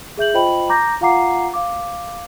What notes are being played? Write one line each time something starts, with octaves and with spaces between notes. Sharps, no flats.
G#4 E5 G6 F#7
F4 C5 D#5 G5 B5 F#7
A#5 D6 G6 A#6
F4 F5 F#5 A#5 D6 C7
F5 D6